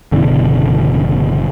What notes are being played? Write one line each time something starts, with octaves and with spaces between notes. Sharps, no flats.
F#1 B2 D3 E3